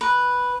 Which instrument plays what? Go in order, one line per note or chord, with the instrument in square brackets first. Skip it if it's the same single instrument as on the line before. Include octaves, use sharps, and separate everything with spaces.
[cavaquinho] B4